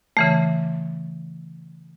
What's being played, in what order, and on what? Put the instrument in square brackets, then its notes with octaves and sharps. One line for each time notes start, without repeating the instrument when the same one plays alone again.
[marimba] C#3 E3 A3